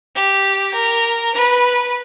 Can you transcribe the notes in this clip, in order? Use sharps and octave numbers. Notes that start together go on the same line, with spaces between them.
G4
A#4
B4